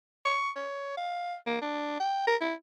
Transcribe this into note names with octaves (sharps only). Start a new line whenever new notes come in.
C#6
C#5
F5
A#3
D4
G5
A#4
E4